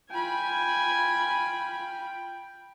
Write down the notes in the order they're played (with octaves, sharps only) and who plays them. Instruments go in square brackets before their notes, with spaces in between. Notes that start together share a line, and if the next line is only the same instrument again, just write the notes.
[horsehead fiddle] F4 B5 [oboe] G5 [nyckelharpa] G#5